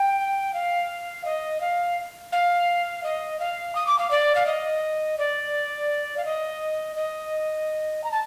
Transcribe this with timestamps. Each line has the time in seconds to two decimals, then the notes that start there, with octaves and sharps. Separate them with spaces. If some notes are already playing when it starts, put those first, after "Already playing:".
Already playing: G5
0.53 F5
1.24 D#5
1.60 F5
2.32 F5
3.03 D#5
3.39 F5
3.75 D#6
3.86 D6
3.98 F5
4.10 D5
4.35 F5
4.46 D#5
5.18 D5
6.17 F5
6.25 D#5
6.96 D#5
8.03 A#5
8.11 A5